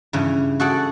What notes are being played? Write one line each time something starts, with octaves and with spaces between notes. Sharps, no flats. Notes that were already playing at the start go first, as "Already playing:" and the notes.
G2 C#3 E3
F#4 G#4 A4 D5 F#5